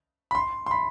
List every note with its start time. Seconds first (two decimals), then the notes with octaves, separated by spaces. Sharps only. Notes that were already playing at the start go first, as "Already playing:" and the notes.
0.31 B5
0.35 C6
0.66 C6
0.71 B5